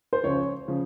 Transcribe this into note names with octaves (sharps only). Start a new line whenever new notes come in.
C5
C#2 C#3 F3 C#5
C#3 F3